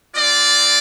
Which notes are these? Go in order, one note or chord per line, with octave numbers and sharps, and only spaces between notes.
C4 F4 D5